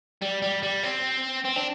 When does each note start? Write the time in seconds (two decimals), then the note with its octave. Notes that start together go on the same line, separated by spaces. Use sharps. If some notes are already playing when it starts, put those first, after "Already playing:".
0.22 G3
0.42 G3
0.63 G3
0.83 C4
1.44 C4
1.56 D4